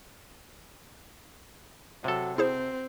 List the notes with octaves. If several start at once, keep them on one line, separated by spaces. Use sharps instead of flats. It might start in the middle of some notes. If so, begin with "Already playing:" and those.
C3 F#3 A4
C4 E4 G#4 C5